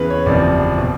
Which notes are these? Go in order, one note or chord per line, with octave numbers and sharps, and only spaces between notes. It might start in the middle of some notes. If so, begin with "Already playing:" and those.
Already playing: E2 C#3 E3 B4
C#5
F#1 E2 C3 F3 D5
B2